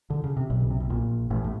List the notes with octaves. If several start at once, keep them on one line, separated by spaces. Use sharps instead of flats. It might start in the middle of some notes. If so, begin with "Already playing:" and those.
D3
C#3
C3
B1 B2
C#3
C3
B2
A#1 A#2
A1 A2
A2